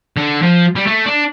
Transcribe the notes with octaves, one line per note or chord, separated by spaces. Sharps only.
D3
F3
G3
A3
D4